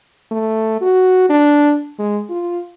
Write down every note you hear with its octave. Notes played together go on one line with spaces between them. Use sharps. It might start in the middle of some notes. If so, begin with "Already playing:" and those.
A3
F#4
D4
G#3
F4